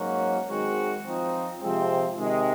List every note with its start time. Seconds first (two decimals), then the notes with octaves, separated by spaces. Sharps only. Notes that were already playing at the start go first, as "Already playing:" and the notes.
Already playing: G#2 F#3 A#3 C#4 F#4
0.49 D#3 G#3 C4 F#4
1.05 F3 C4 D#4
1.60 C3 F3 G#3 C4
2.17 C3 D#3 G#3